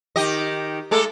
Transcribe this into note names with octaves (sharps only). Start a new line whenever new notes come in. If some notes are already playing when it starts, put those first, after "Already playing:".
D#3 G4 D#5
G#3 A3 A4